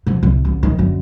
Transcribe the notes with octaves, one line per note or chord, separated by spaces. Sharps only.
B2 F3
C2 C3
A1 D2
B1 D#3
F#2 D3